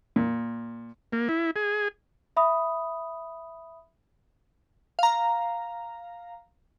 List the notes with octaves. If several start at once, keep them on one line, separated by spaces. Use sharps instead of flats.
A#2
A#3
E4
G#4
E5 B5 D#6
F5 A#5